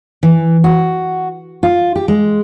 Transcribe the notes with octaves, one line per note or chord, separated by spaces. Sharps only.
E3
F#4
F4
G4
G#3